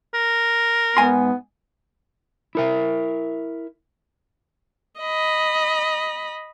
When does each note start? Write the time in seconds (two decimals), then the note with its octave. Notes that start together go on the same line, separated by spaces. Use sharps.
0.14 A#4
0.97 G#2 B3 G#5 C6
2.55 E4 A#4 E5
5.00 D#5 B5